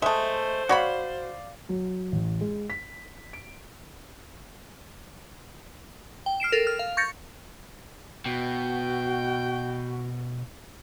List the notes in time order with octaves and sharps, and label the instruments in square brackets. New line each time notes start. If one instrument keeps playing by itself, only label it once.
[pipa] G#3 A3 [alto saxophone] C5 [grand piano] E5 A5
[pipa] F#4 C#5 B5 [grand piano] D5 F5
[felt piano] F#3
A1
G#3
B6
D7
[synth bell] G5
F6 C7 D7 E7
A4 A#4
F6
F5
C#6 G6 A6 A#6 C#7
[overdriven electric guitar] B2 [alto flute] F#4 [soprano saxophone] G5